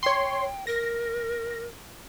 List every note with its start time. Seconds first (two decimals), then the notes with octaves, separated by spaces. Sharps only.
0.03 C#5 G5 C6
0.67 A#4 A#6